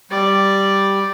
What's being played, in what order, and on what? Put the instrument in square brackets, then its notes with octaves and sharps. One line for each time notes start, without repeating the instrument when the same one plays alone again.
[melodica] G3 [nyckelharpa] D5